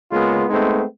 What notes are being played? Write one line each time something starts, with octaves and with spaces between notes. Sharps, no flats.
C#3 G#3 A#3 B3 F4
G#3 A3 B3 C4 D#4